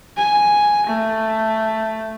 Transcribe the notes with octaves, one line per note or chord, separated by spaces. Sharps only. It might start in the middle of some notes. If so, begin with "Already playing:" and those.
G#5
A3